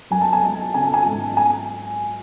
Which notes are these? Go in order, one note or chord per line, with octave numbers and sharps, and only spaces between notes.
F#2 G#5
A5
G#5
G#3
C#3 G#5
A5
G#5
G#1
G#5